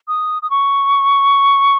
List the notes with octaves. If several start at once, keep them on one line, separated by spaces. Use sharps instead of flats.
D#6
D#6
C#6